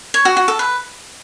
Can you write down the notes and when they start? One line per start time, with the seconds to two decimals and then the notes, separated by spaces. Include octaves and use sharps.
0.14 C#5
0.25 F#4
0.37 F#4
0.48 A4
0.59 B4